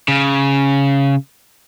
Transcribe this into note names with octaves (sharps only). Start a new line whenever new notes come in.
C#3